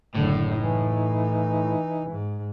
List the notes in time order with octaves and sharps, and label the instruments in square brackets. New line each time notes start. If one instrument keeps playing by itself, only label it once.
[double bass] F#1 D3 [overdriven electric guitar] A2
[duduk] E3 [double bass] D#4
[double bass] G#2